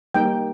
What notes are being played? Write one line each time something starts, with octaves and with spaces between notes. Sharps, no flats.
G3 A#3 D#4 G4 G5